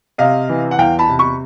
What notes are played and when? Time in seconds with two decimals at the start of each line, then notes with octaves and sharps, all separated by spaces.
0.18 C3 D#5 F5
0.49 E3
0.71 F#5
0.78 E2 F5 G5
0.99 A5 B5
1.09 C3
1.19 B5 C#6